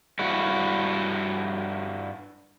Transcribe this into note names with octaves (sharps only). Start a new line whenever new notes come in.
G2 E4 F#4